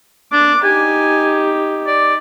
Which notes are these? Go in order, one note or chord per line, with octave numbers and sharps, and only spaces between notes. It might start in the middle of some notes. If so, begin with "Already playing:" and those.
D4 D6
D#4 G4 G#5
D5